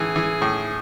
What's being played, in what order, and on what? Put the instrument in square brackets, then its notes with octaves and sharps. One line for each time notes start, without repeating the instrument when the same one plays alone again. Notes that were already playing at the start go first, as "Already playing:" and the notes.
Already playing: [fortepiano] A2 E3 [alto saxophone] G#4
[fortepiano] E3
A2